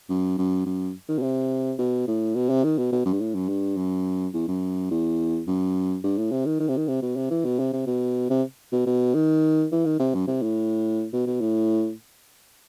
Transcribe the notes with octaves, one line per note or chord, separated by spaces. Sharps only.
F#2
F#2
F#2
D#3
B2
C3
B2
A2
B2
C3
D#3
B2
B2
F#2
G2
A2
F#2
G2
F#2
E2
F#2
E2
F#2
G2
A2
C3
D#3
D#3
C3
D#3
C3
B2
C3
E3
B2
C3
C3
B2
C3
B2
B2
D#3
E3
D#3
C3
F#2
C3
A2
B2
B2
A2